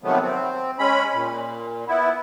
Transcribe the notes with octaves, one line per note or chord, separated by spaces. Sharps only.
C3 D#3 F3 F#3 A3 B3
C4
G#3 C#4 B5
A#2
B3 E4